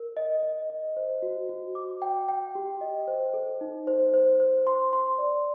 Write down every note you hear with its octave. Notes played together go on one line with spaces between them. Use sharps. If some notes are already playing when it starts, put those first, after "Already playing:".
Already playing: A#4
D#5
D#5
D#5
C5
F#4
F#4
D6
G5
G5
G4
D#5
C5
A4
D#4
C5
C5
C5
C6
C6
D5